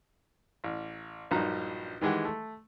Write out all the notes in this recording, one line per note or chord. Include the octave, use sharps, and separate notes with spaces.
A1
A#1 G2 F#3 D#4 A#5
D#3 E3 G#3 G4 F#5
A3